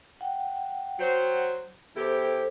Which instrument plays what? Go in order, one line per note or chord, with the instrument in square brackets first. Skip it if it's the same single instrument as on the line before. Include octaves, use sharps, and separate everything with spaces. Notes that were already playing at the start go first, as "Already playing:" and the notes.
[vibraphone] F#5 G5
[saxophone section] F#3 C5
[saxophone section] E2 E4 G4 [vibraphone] A4 C5